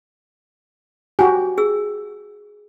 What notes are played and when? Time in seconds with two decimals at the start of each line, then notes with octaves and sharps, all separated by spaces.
1.19 F#4 G4 G#5
1.58 G#4 E6